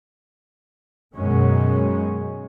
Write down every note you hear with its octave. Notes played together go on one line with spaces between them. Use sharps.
F#2 B2 D#3 G#3 C#4